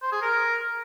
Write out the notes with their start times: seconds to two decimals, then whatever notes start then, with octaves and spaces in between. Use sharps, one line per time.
0.02 C5
0.12 G#4
0.22 A#4